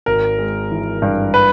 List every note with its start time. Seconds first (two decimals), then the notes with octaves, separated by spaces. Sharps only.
0.06 G#1 A#4
0.38 G#3
0.71 E3
1.02 G2
1.34 B4